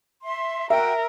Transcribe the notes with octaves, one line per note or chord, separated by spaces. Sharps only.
E5 C6
F#4 A#4 E5 G5